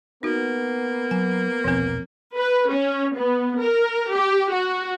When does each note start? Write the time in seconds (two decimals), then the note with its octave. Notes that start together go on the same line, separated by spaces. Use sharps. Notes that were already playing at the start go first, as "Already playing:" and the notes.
0.23 A#3 B3 D#4 F#4
1.11 F#3 G#5
1.64 A#1 E2 B2 F3 C4
2.36 B4
2.71 C#4
3.16 B3
3.60 A#4
4.11 G4
4.51 F#4